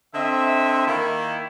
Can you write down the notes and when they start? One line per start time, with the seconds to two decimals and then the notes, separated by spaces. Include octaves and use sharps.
0.14 D3 C4 D#5 E5
0.85 D#3 A#3 E4